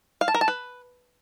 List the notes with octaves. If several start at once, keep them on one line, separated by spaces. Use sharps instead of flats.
F5
A5
A#4
A5
B4